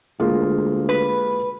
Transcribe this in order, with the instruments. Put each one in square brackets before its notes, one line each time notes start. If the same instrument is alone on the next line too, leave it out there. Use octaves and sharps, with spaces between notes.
[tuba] D2 [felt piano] G#3 A#3 F4
[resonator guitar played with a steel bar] B4